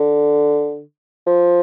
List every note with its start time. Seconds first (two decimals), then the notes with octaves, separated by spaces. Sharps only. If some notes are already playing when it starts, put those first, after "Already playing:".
Already playing: D3
1.27 F3